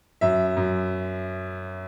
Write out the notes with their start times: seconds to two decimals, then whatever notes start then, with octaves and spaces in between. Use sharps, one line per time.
0.21 F#2 E5
0.57 F#2